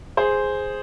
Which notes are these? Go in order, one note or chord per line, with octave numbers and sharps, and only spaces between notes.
G#4 C5